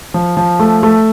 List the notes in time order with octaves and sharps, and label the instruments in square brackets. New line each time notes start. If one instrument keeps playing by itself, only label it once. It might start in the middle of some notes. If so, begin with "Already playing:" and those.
[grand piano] F3
F3
A3
A3